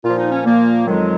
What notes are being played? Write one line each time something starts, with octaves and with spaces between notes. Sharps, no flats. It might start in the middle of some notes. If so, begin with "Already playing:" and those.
A#2 F3 F4
D#4
C#4
A#2 F3 A#3
F2 D#3 F#3 G#3